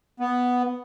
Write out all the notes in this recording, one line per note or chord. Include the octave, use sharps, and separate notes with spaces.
B3